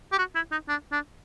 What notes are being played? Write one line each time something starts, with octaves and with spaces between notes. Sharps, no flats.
G4
F#4
E4
D#4
D4
D4